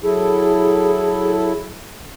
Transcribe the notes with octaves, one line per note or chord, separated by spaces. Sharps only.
F#3 E4 G#4 A4